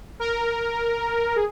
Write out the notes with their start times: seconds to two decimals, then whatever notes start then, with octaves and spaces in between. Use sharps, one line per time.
0.20 A#4
1.36 G#4